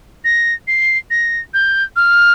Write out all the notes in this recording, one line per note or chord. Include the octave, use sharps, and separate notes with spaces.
A#6
C7
A#6
G6
F6